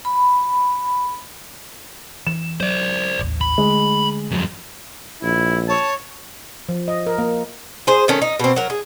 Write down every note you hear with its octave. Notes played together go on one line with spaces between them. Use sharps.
B5
E3 E7
F#3 C5 D5
D#1 A1 D#2
B5
D3 G#3 A3
F2 F#3
A#1 E4
C#5 A5
F3
D#5
A#4
A#3
G#4 C5
D#3 A3 C#4
D#4
B2 C4
F#3 A#4
G#4